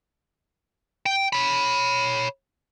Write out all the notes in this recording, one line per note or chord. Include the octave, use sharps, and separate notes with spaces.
G5
C#5 B5